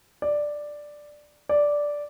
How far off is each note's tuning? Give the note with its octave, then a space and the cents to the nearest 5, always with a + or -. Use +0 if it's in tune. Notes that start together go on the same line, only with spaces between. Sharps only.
D5 +5
D5 -5